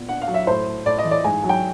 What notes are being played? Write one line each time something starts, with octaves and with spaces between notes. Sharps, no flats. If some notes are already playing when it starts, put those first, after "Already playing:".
Already playing: A#2 B3
D4 F#5
F5
F#3
E5
A2 C5
A3
A2 D5
D#5
E3
D5
G#2 G#5
F#3
G5